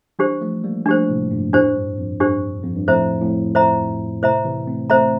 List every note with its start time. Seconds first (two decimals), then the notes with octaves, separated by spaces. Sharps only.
0.19 E3 G3 D4 G4 C5
0.41 F3 A3
0.64 G3 A#3
0.86 F3 A3 D4 G4 C5
1.08 A2 C3
1.31 G2 A#2
1.53 F2 A2 D4 G4 C5
1.76 G2
1.98 F2
2.20 G2 D4 G4 C5
2.64 F2
2.76 G2
2.88 F2 A2 C5 E5 A#5
3.22 F2 A2
3.55 C5 E5 A#5
4.23 A2 C3 C5 E5 A#5
4.45 C3 E3
4.67 A3 C4
4.90 A3 C4 C5 E5 A#5